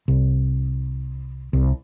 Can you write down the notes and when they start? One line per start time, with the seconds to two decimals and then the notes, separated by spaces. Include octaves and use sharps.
0.08 C2
1.53 C2